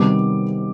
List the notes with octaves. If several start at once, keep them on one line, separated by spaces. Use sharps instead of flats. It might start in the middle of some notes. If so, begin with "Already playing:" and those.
Already playing: C3 D#3 G3 B3 D6